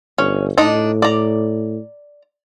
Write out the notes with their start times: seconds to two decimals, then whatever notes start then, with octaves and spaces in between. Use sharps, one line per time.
0.18 G1 C#4
0.58 A2 D4 D#4 D#5
1.02 D5 A#5